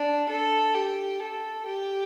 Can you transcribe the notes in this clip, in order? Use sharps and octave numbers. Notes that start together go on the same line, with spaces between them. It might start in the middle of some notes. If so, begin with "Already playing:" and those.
Already playing: D4
A4
G4
A4
G4